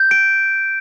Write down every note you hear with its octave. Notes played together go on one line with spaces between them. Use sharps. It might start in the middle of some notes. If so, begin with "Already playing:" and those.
Already playing: G6
D7